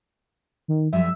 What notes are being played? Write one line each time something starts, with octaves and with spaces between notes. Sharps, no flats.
D#3
F#2 F3 G3 E5